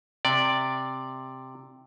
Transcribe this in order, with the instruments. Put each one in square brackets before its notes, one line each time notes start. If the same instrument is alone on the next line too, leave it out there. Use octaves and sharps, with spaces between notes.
[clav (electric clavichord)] C3 D5